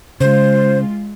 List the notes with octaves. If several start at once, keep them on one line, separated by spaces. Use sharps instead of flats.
C#3 G#3 F4 C5